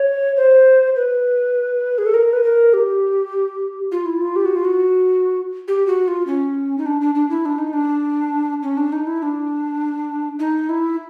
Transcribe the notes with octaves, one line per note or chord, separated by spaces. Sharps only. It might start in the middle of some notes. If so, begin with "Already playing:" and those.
Already playing: C#5
C5
B4
G#4
A4
A#4
B4
A#4
G4
F4
E4
F4
G4
F#4
F4
F#4
G4
F#4
F4
C#4
D#4
D4
D4
D4
E4
D4
D#4
D4
C#4
D4
D#4
E4
D4
D#4
E4